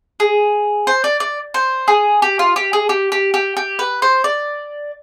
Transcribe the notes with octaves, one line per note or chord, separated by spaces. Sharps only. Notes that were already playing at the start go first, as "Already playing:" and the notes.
G#4
C5
D5
D5
C5
G#4
G4
F4
G4
G#4
G4
G4
G4
G4
B4
C5
D5